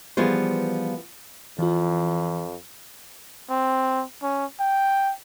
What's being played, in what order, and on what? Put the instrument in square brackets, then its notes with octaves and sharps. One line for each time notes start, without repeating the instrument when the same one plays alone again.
[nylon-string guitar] E3 F3 G3 B3 G#4 C5
[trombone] F2 [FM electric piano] E3 F4
[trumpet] C4
C#4
G5